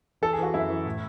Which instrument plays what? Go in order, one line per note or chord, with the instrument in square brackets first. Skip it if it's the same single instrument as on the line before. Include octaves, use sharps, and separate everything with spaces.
[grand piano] E3 A4
G#4
E3 F#4
F#2 E4
E3
A2